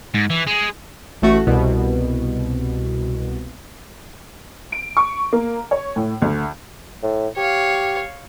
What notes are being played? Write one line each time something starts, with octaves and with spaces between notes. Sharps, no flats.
G#2
E3
G#3
A1 A3 F#4
C2 B2
D7
C#6
A#3
C#5
A2
D2
A2
G4 C#5 F5